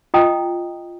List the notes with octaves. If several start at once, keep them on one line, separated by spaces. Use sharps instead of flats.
F4 D#5 G5 A#5 D#6